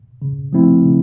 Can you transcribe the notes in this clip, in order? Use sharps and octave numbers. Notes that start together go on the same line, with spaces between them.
C#3
F3 A3 C4 E4
C#3